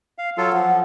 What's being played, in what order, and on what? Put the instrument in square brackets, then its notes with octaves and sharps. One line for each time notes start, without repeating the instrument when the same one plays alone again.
[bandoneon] F5
F#3 F4 A4
[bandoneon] F3 [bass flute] F#5